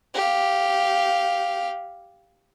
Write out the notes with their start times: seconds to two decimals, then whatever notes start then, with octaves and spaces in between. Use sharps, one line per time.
0.14 G4 F5